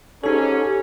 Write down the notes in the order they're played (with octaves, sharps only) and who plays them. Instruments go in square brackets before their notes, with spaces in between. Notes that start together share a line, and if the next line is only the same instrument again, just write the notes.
[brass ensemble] G#2 C#4 [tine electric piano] D#4 A4 [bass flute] G4